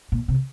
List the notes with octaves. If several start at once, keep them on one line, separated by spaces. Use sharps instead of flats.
A#2
C3